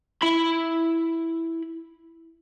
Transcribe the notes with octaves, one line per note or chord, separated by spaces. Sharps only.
E4 B5